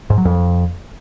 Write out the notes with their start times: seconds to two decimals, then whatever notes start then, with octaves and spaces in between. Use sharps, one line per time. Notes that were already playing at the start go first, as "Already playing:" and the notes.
0.10 G#2
0.18 F#3
0.25 F2